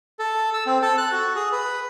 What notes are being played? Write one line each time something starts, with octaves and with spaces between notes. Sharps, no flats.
A4
E6
C4
A4
F#6
F#4
G#4
B4